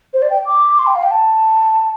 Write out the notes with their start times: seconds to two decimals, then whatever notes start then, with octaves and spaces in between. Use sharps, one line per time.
0.14 C5
0.22 D5
0.30 G5
0.46 D6
0.79 C6
0.87 G5
0.95 F5
1.03 G5
1.11 A5